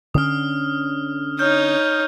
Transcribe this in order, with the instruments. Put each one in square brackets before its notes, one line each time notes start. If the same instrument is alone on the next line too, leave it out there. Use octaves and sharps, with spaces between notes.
[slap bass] D3 C4 C#4 [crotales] D#6 F6
[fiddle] D#4 C#5 [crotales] F6 G6